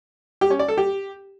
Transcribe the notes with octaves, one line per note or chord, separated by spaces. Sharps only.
G4
C#4
D5
A4
G4